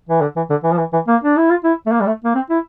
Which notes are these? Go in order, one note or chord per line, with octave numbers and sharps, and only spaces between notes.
E3
D3
E3
D3
E3
F3
E3
E3
A#3
D4
E4
F4
E4
A3
A#3
G3
A3
A#3
C4
E4